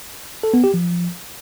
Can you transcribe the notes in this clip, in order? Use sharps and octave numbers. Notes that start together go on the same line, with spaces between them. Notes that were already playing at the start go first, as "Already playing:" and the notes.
A4
B3
G4
F3